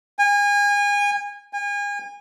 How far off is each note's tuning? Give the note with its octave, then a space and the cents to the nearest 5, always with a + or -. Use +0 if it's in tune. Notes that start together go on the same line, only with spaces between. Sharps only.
G#5 -30
G#5 -35